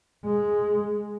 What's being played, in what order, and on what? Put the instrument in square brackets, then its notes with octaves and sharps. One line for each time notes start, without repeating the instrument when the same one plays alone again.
[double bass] G#3